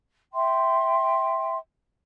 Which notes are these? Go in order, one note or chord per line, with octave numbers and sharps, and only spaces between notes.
E5 G5 C6